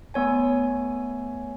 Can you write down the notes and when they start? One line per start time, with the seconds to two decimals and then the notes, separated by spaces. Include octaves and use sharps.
0.14 A3 B3 C#5 G#5